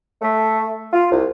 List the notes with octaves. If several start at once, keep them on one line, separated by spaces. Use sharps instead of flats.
A3
F4
C2